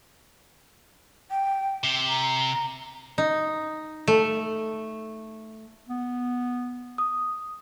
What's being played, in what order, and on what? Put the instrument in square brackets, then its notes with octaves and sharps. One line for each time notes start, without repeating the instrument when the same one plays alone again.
[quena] G5
[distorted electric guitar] C3
[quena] A#5
[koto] D#4
A3
[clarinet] B3
[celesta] D#6